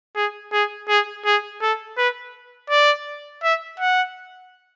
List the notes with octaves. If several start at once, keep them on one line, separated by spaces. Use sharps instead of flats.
G#4
G#4
G#4
G#4
A4
B4
D5
E5
F#5